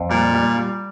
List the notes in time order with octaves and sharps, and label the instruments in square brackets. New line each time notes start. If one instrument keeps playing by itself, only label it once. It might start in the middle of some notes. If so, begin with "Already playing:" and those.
Already playing: [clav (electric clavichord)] F2
[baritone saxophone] A#2 [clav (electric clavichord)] G3
[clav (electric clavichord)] G3
G3